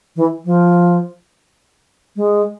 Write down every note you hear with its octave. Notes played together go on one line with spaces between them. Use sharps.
E3
F3
G#3